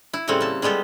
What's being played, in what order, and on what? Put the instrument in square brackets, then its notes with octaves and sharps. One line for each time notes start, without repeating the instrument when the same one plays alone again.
[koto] E4
A2 C#3 G3 A3 C4 F#5
A#3 A5
G3 G#3 B3 G4 A4